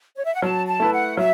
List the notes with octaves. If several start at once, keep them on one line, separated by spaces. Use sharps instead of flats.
C#5
E5
F#5
F#3 A5
A5
A3 E4 B4
F#5
F#3 E5